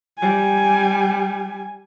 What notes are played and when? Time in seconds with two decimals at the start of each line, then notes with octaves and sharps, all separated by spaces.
0.19 G3 G#5